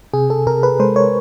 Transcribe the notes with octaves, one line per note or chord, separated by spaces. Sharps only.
C3 G#4
A4
C3 A#4
B4
G#3 C5
C#5